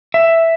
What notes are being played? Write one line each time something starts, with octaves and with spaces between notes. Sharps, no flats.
E5